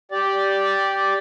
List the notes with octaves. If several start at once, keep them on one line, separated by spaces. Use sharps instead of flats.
G4 D5